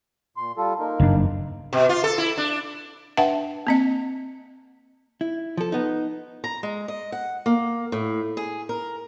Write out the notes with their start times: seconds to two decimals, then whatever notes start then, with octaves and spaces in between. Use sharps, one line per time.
0.37 A#2 C6
0.57 G3 F4 A4
0.79 A#3 D#4 A#4
1.00 F#1 G2 D4
1.73 B2
1.89 F4
2.04 A4
2.18 E4
2.37 D4
3.17 D4 B4 E5 F#5 G5 A5
3.67 A#3 C4 D#5
5.21 E4
5.57 F3 A4
5.72 B3 D#4
6.44 A#5
6.63 G#3
6.88 D#5
7.12 F#5
7.46 A#3
7.92 A2
8.37 G#4
8.69 A#4